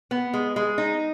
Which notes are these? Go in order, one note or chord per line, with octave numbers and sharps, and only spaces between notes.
B3
G#3
G#3
D#4